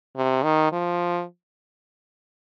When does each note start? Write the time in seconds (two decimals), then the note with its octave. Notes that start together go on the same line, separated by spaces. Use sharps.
0.16 C3
0.44 D#3
0.73 F3